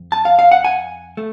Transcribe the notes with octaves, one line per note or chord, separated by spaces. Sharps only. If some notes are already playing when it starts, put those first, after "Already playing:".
Already playing: F2
A5
F5
F5
F#5
G#5
A3